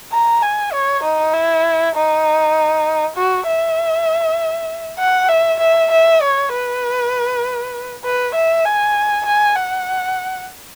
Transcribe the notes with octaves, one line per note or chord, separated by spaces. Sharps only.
A#5
G#5
C#5
D#4
E4
D#4
F#4
E5
F#5
E5
E5
E5
C#5
B4
B4
E5
G#5
G#5
F#5